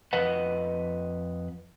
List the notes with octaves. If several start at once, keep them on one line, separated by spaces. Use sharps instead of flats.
F2 B4 D#5 F#5